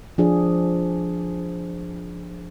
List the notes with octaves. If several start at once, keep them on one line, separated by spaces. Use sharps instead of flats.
F3 D4 G#4